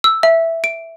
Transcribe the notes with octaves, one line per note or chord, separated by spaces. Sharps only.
E6
E5
D7